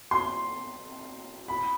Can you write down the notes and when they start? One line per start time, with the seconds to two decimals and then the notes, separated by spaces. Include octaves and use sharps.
0.11 C6
1.48 B5